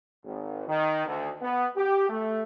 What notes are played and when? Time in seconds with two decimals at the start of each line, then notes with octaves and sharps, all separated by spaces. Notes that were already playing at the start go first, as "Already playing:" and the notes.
0.24 G#1
0.68 D#3
1.06 D2
1.41 B3
1.76 G4
2.09 A3